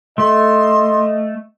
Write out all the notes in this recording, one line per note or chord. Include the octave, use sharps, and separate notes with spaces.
A3 D#5 C6